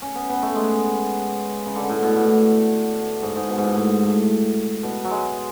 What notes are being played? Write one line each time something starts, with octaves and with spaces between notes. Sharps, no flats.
C#4
B3
B3
A3
G#3
C#3
D3
A2
B2
A2
G#2
G#2
B2
G#2
A2
G#2
A2
B2
F#3
G#3